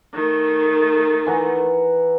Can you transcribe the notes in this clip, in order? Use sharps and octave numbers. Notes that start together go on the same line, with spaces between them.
D#3 A3
E3 F#5 A#5